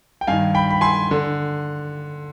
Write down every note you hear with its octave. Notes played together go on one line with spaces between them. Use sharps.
G5
G2 D#3 F5 G#5
G5 B5
B5
G#5 C6
D3